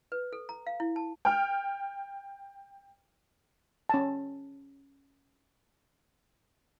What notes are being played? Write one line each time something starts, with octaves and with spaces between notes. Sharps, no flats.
B4
A4
A#5
F5
E4
A5
G5 F6
C#4 A5